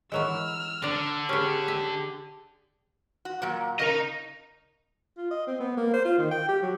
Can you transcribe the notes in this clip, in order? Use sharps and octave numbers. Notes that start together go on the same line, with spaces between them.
E3 F#3 G#3 E6 F6
D3 D4 A#5
C#4 G4 G#4 B4
E5
F#4
A#2 F#3
C#3 A#4 D#5 A#5
F4
D#5
C4
B3
A#3
C5
F4
D#3
G5
G4
F#3